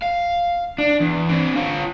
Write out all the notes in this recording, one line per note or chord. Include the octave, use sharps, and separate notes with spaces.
F5
D4
E2
C4 D4
F4 C#5